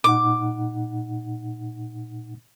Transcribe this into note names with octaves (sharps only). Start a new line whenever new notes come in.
A#2 D#4 F#5 D6